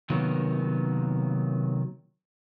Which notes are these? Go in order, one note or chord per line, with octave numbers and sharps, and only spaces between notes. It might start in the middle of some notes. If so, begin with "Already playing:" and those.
C3 D#3 F#3 A#3 B3